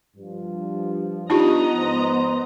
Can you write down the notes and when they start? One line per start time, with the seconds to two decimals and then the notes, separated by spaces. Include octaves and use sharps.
0.17 G2 F3
1.30 B3 D4 D#4 F4 G4 D#5 A#5
1.75 G#2 F3 C5